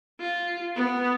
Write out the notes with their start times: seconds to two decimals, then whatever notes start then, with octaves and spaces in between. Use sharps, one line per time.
0.20 F4
0.76 B3